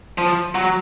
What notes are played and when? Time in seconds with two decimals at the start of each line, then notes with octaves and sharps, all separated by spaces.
0.18 F3
0.55 F#3